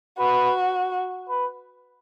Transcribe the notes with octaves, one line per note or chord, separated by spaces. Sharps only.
F#4 B4
B4